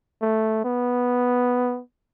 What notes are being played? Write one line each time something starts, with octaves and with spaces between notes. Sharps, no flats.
A3
B3